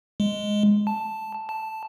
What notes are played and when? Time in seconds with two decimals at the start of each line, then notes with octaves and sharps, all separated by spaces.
0.20 G#3
0.87 A5
1.49 A5